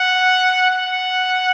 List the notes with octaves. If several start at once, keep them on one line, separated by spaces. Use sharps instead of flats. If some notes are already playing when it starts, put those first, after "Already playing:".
Already playing: F#5
F#5